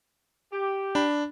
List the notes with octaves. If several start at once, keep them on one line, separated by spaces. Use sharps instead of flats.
G4
D4 B5